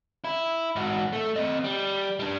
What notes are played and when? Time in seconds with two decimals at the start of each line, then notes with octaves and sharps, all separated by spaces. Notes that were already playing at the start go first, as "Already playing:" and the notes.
0.24 E4
0.76 G#2 F#4
1.13 A3
1.36 C4 D#5
1.64 G3
2.20 G3 D4